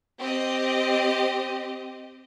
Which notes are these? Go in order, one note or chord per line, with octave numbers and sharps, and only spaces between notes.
C4 G4 D#5